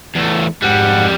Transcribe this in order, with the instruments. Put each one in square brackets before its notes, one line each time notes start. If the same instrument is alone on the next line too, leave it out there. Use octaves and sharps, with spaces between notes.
[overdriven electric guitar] E2 A3
[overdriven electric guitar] F2 G3 [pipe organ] G#2 F#5